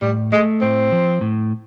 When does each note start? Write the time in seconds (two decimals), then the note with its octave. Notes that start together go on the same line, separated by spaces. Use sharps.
0.02 A2 G3
0.32 G#3 A3
0.62 A2 C4
0.92 F3
1.21 A2